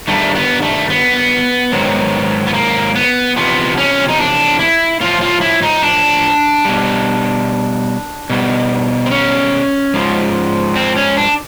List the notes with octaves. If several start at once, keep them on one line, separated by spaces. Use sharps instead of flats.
G2 D#3 G3 A3
B3
A3
B3
G#2 D#3 F#3
B3
A#3
B3
E2 C3 F3 B3
C#4
D#4
D4
E4
A2 F3 F4
F4
E4
D#4
D4
B2 G3
B2 G3
C4
C#4
G#2 F3
C4
C#4
D4